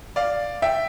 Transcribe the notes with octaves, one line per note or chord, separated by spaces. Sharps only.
D5 F5
E5 G5